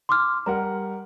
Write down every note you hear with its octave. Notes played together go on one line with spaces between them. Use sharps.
C6 D6 F6
G3 A#4 F#5 A#5